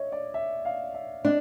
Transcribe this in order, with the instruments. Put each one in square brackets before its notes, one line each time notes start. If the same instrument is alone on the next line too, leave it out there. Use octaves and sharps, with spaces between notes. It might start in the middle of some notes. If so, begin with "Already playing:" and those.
Already playing: [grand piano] C#5 D#5 E5
D5
E5
F5
E5
[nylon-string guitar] D4 [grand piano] D#5